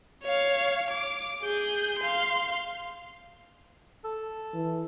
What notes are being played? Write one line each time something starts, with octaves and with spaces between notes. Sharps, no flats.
C#5 F5
D6
G#4 G6
F5 C6
A4
E3